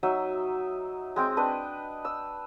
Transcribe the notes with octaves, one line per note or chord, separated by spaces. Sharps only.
F#3 D#4 D#5 E5
G#3 C4 G5
D4 B4 D#5
E6